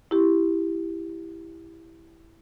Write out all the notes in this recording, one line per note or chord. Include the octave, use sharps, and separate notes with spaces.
E4 G4